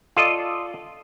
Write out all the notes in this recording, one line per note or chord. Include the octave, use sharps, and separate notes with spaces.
F4 A4 D5 D#5